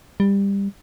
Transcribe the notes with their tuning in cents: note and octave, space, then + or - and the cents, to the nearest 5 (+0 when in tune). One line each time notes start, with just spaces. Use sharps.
G3 +20